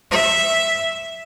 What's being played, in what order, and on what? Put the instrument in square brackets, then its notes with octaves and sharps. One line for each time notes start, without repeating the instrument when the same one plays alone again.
[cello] E5